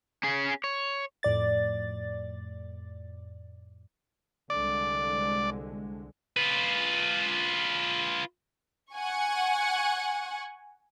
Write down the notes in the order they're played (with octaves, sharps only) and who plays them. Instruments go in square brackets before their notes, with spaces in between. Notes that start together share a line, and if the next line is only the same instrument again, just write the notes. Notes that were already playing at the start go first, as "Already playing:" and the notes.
[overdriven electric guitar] C#4 G#4
C#5
[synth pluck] F2 A2 D5 A6
[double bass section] C2 D3 G#3 [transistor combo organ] D5
[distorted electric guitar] F4 B4
[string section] F#5 G#5 C#6